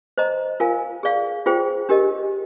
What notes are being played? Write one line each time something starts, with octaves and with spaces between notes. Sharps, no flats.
C5 D#5 A#5
F4 A#4 F5 G#5
G#4 D5 F5
F4 G#4 C5 G5
D4 G4 A#4 D#5